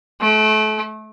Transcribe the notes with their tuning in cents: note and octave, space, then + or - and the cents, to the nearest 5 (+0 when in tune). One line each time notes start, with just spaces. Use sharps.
A3 -30